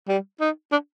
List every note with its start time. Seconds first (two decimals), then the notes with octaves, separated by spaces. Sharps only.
0.08 G3
0.40 D#4
0.72 D4